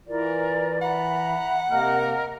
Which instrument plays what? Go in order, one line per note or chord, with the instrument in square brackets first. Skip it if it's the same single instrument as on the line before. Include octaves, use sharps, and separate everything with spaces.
[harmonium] E3 [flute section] F4 A#4 D5
[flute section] E5 A#5 B5 [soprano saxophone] F#5
[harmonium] C3 A#3 [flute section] A#4 D#5 F6